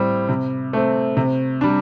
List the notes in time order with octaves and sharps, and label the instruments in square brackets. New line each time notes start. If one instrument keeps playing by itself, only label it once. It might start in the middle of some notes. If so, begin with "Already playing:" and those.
Already playing: [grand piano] A2 G3 C4
C3
A3 C4
C3
G3 D4